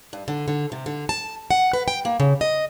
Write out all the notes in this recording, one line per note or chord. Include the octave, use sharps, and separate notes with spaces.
G2
D3
D3
C3
D3
A5
F#5
B4
G5
A#3
C#3
D#5